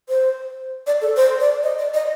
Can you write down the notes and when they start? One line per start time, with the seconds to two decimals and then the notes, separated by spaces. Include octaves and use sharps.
0.09 C5
0.87 D5
1.01 A4
1.17 C5
1.40 D5
1.63 D#5
1.78 D5
1.94 D#5